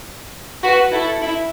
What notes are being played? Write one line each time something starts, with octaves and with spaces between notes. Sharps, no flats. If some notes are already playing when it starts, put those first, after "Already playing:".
F#4 B4
E4 A4
E4